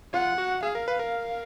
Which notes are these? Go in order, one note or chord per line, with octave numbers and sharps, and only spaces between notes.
F4 F#5
F#4
G#4 F5
A#4
B4
A#4